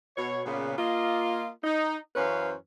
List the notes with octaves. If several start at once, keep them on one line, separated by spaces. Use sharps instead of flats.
B2 C#5
A#2 C#3 B3
A#3 F4 D#5
D#4
F#2 E3 C#4 B4 C5 F5